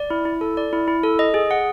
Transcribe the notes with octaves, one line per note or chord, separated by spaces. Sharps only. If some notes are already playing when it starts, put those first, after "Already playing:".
Already playing: D5
E4
E4
A4
D5
E4
E4
A4
D#5
G#4
F#5